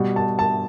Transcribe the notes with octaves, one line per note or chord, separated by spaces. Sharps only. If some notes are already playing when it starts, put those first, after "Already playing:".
Already playing: B2 G3
A5
A5